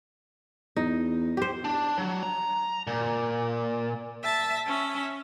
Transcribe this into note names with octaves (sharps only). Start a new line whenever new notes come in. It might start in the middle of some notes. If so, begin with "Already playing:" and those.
E2 D#4
G4 C5
D4
F#3
A#5
A#2
E5 A5
C#4 E5